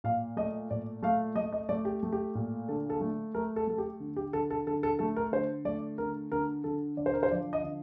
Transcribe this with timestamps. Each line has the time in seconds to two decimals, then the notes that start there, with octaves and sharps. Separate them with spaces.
0.04 A#2 F5
0.37 A3 D#5
0.71 A#2 D5
1.03 A3 F5
1.36 A3 D#5
1.52 D#5
1.69 A3 D5
1.85 G4
2.03 A3
2.12 G4
2.35 A#2
2.68 D3 A4
2.90 A4
3.01 A3
3.34 A3 A#4
3.56 A4
3.67 A3 A4
3.78 G4
4.00 D3
4.16 G4
4.33 D3 A4
4.50 A4
4.67 D3 A4
4.83 A4
4.99 A3 A4
5.16 A#4
5.32 D3 C5
5.65 A3 D5
5.98 D3 A#4
6.32 D3 A#4
6.64 D3 A4
6.97 D3 D5
7.06 C5
7.13 A#4
7.23 C5
7.31 F3 D5
7.53 D#5
7.64 D3